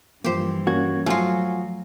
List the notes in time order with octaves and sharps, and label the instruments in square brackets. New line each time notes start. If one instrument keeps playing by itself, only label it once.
[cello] G2 E3 [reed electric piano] F3 A#3 [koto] G4 C5
[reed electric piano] A#3 C#4 G#6 [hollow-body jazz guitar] F#4
[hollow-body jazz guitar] F3 F#4 [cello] F#3 [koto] A3 F4 [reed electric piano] G#5